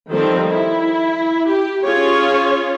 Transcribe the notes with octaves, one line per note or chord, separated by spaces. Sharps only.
D#3 F3 G3 C4 A4 C5
E4
G4
C#4 F4 G#4 C#5